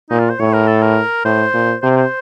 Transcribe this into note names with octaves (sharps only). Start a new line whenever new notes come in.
A#2 D#4
F4
C5
A2 C#5
A#4
A4
A#4
A2 C5
A#2
C3 C5
C5